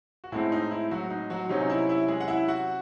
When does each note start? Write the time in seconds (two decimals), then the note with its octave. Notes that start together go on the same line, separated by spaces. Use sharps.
0.24 F#4
0.32 A2 G#3 C4 E4
0.52 D#4
0.71 E4
0.91 F#3 F#4
1.10 D#4
1.30 F#3 F#4
1.49 C3 F#3 C#4 D#4
1.61 D#4
1.70 E4
1.89 E4
2.08 G#3 G#4
2.20 F#5
2.28 E4 E5
2.48 F#4 F#5